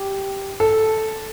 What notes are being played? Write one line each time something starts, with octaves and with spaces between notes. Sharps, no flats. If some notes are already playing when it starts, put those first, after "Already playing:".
Already playing: G4
A4